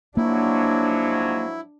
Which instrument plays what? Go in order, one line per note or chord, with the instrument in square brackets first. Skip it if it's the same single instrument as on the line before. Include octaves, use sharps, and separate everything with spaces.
[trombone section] G#2 F3 F#3 [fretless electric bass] A#3 [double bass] D4 [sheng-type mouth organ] E4